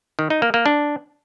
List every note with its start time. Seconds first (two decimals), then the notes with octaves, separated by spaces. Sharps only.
0.19 D#3
0.30 D#4
0.42 A#3
0.54 A#3
0.66 D4